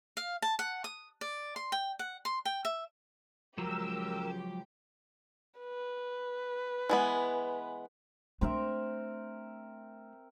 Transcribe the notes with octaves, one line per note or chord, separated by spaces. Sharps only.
F5
A5
F#5
D#6
D5
C6
G5
F#5
C6
G5
E5
C#2 F3 F#3 G4 A#4 E6
B4
E3 G#3 B3
A3 C4 D4 A#4 E5